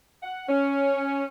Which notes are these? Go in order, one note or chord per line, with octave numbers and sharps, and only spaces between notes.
F#5
C#4